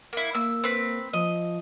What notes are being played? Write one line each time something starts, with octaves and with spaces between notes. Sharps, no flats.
A#3 E4
A#3 E6
C4 B4
F3 D#5